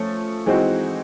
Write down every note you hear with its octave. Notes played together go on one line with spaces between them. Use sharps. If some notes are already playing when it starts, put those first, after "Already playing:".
Already playing: F3 A3 C#4 A4
E3 G#3 C4 D#4 F#4